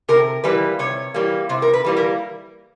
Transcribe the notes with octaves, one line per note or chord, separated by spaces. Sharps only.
C3 A#4
E3 G3 A#3 B4
C3 C#5
E3 G3 A#3
C3 C5
A#4
B4
E3 G3 A#3
A#4